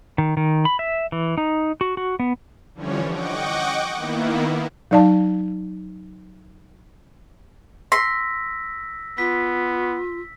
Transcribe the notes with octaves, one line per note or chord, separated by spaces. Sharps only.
D#3
D#3
B5
E5
E3
D#4
F#4
F#4
B3
D3 E3 F3 G3 C#4 C#5
D#5 F#5 G5 C#6 D6
D#3 A#3 B3 E4
F#3 D#4 D5 F5 A5
C6 E6 A#6 B6
B3 F4 B6